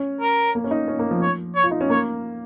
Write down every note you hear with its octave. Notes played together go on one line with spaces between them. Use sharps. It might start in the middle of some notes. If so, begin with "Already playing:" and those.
Already playing: C#4
A#4
A#3
C#4
D#4
C#4
A#3
F3
C#5
C#5
F4
D#4
C#4
A#3 C#5